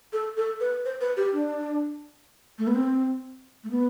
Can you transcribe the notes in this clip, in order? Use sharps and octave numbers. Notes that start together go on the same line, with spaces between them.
A4
A4
B4
C5
B4
G4
D4
A3
B3
C4
A3
B3